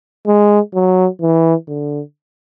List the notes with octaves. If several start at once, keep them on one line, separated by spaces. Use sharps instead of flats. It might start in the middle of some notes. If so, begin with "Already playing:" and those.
G#3
F#3
E3
D3